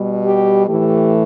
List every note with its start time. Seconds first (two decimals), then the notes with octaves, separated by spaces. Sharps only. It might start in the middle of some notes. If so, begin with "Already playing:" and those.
Already playing: B2 G3
0.24 G4
0.67 A2 E3 A3 G4